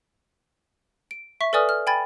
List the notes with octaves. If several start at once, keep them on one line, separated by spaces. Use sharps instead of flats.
D7
E5 C#6 B6
A4 B4 D5 G#5 D#6 F6
F6
G5 G#5 B5 G#6 A6